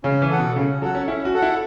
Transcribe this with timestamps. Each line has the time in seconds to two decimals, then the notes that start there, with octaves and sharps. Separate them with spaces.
0.04 C#3 C#4
0.22 E3
0.30 A4 F#5
0.38 B2
0.56 C#3 C#4
0.82 F#3 A4 F#5
0.95 C#4
1.08 C#4 E4
1.25 F#4
1.34 A4 F#5
1.42 E4